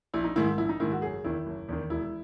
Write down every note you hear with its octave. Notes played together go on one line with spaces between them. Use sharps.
A#1 E4
D#4
G#2 D#3 E4
A#1 E4
D#4
G#2 D#3 E4
F#4
F#1 G#4
E2 D#3 E4
F#1
E2 D#3
E1 E4